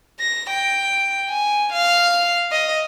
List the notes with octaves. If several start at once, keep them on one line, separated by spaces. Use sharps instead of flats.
A#6
G5
G#5
F5
D#5